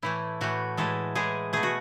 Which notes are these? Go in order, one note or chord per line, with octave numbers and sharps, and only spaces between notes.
A2 E3 A3 E4
A2 E3 A3 F#4
A2 E3 G#3 A4
A2 E3 G#3 G#4
B2 A3 G#4
F#4